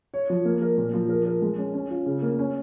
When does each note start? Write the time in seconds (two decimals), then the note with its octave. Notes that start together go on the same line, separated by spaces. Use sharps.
0.14 C#5
0.30 F3
0.45 A#3
0.62 A#4
0.78 A#2
0.94 F3
1.09 A#4
1.26 A#4
1.42 G#3
1.58 C#4
1.74 C#4
1.90 F4
2.06 C#3
2.22 A#3
2.39 C#4